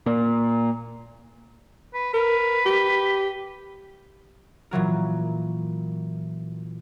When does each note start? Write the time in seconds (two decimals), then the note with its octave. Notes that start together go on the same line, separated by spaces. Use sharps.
0.06 A#2
1.94 B4
2.14 A#4 B4
2.66 G4
4.71 A#2 E3 F#3 A#4